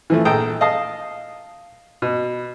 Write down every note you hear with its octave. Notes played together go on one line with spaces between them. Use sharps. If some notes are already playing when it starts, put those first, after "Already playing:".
E3 F3 A3
A#1 G#4 A4 G5 A#5 D#6
D#5 F5 A5 D#6
B2